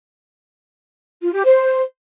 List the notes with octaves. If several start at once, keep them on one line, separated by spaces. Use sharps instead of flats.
F4
G4
C5